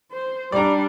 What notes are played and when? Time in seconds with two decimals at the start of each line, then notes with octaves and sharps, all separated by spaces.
0.12 C5
0.52 G3 D4 D5 A#5